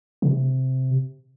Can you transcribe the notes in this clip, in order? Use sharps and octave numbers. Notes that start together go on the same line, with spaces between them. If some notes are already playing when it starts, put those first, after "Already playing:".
C3